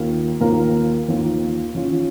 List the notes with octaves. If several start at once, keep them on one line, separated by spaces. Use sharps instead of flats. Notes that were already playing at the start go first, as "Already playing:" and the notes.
Already playing: D#2 D#3 A#3 F4 A#4
D#2 D#3 A#3 F4 A#4
D#2 D#3 A#3 F4 A#4
D#3 C#4 F4